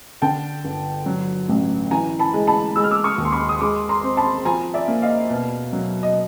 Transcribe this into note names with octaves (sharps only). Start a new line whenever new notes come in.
D3 G5 A5
G1
F#3
A1
E3 G#5 A#5
A5 B5
G#3
A5 B5
G#3 E6
F6
D6 E6
C#6 D#6
D#2
C6
B5 C#6
D#6
G#3 C6 D6
A#5 C6
C4
A5 B5
F3 G#5 A#5
D5 E5
A#3
D#5 F5
B2
F#3
D#5